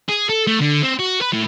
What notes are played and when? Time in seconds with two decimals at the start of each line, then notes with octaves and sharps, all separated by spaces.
0.08 G#4
0.29 A4
0.47 A3
0.61 D3
0.82 C4
1.00 F#4
1.21 B4
1.33 A2